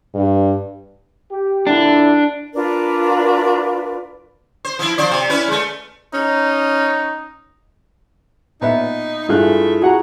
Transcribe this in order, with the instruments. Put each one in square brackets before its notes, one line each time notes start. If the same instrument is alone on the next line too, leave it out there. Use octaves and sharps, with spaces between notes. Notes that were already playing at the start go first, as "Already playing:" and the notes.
[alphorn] G2
[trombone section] G4
[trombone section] A#2 D3 E4 [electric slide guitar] D4
[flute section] D4 F4 A#4 B4
[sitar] C5
F3 E4
F3 C5 D5
C3
C#4 E4 B4
G#3 A3
[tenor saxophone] C#4 [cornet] D#4
[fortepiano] A#2 B3 E5 [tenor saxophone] D#4
[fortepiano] G2 F5 F#6 [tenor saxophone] A3 [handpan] E4 F4 G#4
[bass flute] F#4 [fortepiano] G#4 F#5 A#5